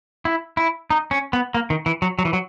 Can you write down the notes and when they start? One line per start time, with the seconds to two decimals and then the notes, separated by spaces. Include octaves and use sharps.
0.25 E4
0.57 E4
0.90 D#4
1.11 C#4
1.33 B3
1.54 A#3
1.70 D#3
1.86 E3
2.02 F#3
2.19 F#3
2.25 E3
2.33 F#3